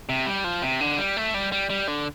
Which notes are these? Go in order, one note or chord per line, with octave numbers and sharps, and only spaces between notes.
C3
G3
F3
C3
D3
G3
A3
G3
G3
G3
D3